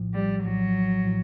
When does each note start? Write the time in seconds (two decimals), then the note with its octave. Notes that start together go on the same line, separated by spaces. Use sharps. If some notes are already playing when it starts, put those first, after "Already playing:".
Already playing: A#1 A2 F3
0.13 G3
0.43 A#1 A2 F3 F#3
1.04 A2 F3